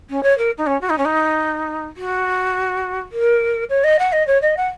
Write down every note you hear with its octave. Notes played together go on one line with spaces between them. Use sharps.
C#4
C#5
A#4
D#4
C#4
F#4
D#4
C#4
D#4
F#4
A#4
C#5
D#5
F#5
D#5
C#5
D#5
F#5